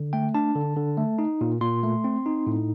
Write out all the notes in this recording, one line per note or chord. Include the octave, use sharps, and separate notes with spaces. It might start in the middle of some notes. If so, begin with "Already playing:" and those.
Already playing: D3
A3 G5
D4 A5
D3
D3
A3
D#4
A#2
A#2 C6
A3
C4
D#4
A2